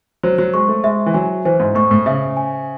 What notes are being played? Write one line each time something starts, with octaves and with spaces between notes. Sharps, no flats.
F#3 C5
F#3
G#3 C#6
A3
G#3 E5
E3
F#3 G#5
E3 C5
G#2
A2 C#6
A2
C#3 E5
G#5